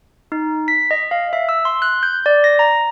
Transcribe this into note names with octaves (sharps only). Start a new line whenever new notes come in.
D#4
B6
D#5
F5
E5
E6
C6
F#6
G6
D5
A#6
A#5